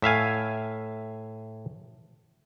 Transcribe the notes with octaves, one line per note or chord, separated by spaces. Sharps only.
A2 E5 F5 G#5